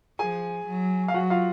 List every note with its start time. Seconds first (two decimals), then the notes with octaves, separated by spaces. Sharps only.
0.19 F3 G#4 G#5
0.67 F#3
1.08 F5
1.14 F#3 F#4 F#5
1.30 F4 F5